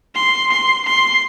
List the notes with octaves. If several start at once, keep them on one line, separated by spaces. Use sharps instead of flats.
C6
C6
C6